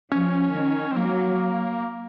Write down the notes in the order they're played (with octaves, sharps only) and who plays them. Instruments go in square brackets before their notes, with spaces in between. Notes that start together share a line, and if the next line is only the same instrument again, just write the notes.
[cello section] F3 [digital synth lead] C#4
[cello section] D#3
[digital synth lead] C4
[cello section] F#3 [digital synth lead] A#3